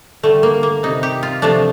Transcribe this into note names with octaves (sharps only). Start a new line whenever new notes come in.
D3 G3 A3
A#3
A#3
C3 G3 D#4
G4
F4
C3 F3 A3 D4